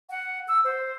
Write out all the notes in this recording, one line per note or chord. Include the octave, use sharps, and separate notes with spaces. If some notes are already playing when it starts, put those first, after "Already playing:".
F#5
E6
C5